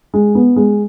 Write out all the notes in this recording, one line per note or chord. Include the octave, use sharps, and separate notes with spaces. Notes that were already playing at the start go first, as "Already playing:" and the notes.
G#3
B3
G#3